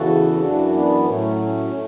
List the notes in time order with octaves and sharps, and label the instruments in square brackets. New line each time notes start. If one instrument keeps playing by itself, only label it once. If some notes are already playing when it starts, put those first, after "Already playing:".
Already playing: [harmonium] E2 C#3 E3 F#4 A4
F#2 E3 D4 F#4
B3 D4
D4
A2 F#3 A3 C#4
A3 C#4
A2 A3